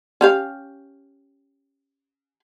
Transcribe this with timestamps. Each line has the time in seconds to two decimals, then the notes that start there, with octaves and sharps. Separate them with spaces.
0.21 C#4 G4 F5